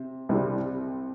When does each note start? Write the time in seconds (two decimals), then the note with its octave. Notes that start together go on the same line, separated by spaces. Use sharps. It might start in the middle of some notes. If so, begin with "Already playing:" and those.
Already playing: C3
0.29 C2 C3 G3